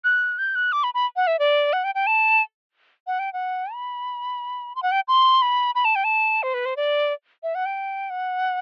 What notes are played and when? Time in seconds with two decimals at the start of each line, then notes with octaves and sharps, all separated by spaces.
0.04 F#6
0.38 G6
0.55 F#6
0.72 D6
0.84 B5
0.94 B5
1.16 F#5
1.27 E5
1.39 D5
1.73 F#5
1.84 G5
1.95 G5
2.07 A5
3.07 F#5
3.19 G5
3.33 F#5
3.73 B5
4.75 C6
4.83 F#5
4.92 G5
5.08 C6
5.42 B5
5.75 B5
5.85 A5
5.96 G5
6.04 A5
6.43 C5
6.54 B4
6.66 C5
6.77 D5
7.43 E5
7.55 F#5
7.66 G5
8.10 F#5